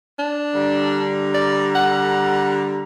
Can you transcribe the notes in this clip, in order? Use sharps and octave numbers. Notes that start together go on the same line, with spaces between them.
D4
D3 G3 A#5
D5
F#5